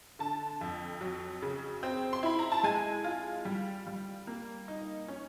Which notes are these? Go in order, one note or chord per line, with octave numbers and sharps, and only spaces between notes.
D3 A5
F2
F#3
C#3
C4
C6
E4 B5
A#5
A5
G#3 G#5
F4
G3
G3
A#3
D#4
C#4